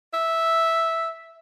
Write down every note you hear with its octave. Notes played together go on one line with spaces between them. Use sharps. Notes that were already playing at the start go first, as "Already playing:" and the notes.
E5